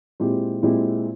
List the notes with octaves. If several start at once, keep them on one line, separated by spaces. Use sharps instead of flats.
A#2 G#3 C4 E4 G4
A#2 G#3 C4 E4 G4